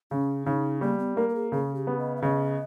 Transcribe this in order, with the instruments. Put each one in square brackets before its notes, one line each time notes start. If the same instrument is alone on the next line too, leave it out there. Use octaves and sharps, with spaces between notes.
[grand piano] C#3 [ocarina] C#4
[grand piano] C#3 [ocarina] D#4
[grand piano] G3 [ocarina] A#3
[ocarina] B3
[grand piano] A#3 [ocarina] A#4
[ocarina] A#4
G#4
[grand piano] C#3 [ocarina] G#4
[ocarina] G4
[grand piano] B3
[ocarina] D#5
E5
[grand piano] C#3 [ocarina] D#5